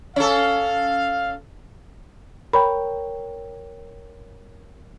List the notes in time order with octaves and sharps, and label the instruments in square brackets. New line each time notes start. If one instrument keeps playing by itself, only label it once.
[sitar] C#4 A4 [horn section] F5
[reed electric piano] A#4 C#5 G5 [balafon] B5